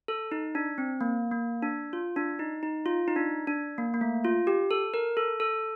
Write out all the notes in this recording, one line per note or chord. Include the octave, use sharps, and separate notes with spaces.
A4
D#4
D4
C4
A#3
A#3
D4
F4
D4
D#4
D#4
F4
D#4
D4
D4
A#3
A#3
A3
F4
G4
A4
A#4
A4
A4